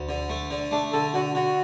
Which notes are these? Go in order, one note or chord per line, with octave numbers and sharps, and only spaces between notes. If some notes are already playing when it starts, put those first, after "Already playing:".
Already playing: D2
D3
A3
D3
A3 D4
D3 A4
D3 F#4
D3 F#4